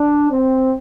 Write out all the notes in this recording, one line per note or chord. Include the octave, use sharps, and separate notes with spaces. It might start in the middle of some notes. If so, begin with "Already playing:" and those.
Already playing: D4
C4